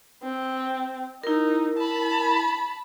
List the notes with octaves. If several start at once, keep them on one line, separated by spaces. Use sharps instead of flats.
C4
D#4 E4 A#4
A5 B5